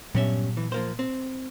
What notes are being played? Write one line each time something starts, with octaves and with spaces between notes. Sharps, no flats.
G2 A#2 F#3 B3 C#4 E5
E3
F3 A#3 C5
C4